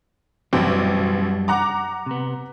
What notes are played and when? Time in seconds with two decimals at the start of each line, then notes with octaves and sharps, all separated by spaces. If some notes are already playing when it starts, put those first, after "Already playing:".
0.53 A1 F#2 B2 G3 C4
1.48 F#5 A#5 D6
2.06 C3 B3